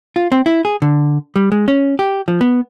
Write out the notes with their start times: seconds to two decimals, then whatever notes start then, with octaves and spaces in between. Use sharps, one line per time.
0.16 F4
0.32 C4
0.46 E4
0.65 G#4
0.82 D3
1.36 G3
1.52 G#3
1.68 C#4
1.99 G4
2.28 F3
2.41 B3